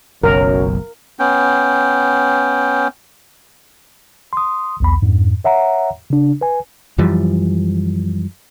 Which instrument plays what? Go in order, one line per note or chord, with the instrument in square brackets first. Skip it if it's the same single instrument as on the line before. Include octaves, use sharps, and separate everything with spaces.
[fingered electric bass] F#1 B1 [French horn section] F#2 C#5 [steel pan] A#4
[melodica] B3 C#4 G5
[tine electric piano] C6 D#6
B1 E2 B5
F2 G#2
C#5 E5 F#5 A#5
C#3 D4
B4 G#5
[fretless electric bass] F#2 E3 F3 G3